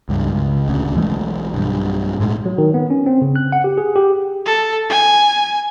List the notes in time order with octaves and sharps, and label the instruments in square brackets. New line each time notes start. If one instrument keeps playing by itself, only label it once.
[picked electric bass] C#2 G2
C#2
D#1 D2 C#3
B1 E3 G#3 A3
B1 G2
A2 G#3
[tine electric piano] F#3
D#3
B3
C#4
C4
C#3
F#6
F#5
G4
G#4
G4
[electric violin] A4
G#5